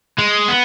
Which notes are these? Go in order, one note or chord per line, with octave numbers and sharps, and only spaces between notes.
G#3
B3